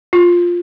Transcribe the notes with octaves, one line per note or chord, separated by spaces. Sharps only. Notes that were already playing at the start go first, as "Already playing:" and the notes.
F4